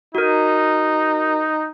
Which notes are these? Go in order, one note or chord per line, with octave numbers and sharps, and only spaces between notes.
D#4 F#4 A#4